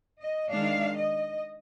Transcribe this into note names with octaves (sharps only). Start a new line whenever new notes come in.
D#5
D#3 G#3 D4 F5
D#5